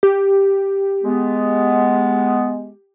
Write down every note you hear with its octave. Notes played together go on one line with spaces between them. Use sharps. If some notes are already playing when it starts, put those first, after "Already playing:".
G4
G#3 B3